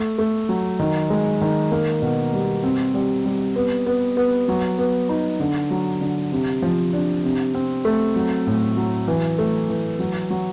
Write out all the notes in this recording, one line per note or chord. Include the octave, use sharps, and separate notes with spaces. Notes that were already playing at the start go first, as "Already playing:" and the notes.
Already playing: A3
A3
F#3
D#3
G#3
D#3
A#3
B2
G3
C4
G3
G3
B3
B3
B3
F#3
B3
D#4
D3
F#3
D3
C3
F3
D4
C3
C4
A3
F#3
A2
F#3
E3
A3
E3
F#3
F#3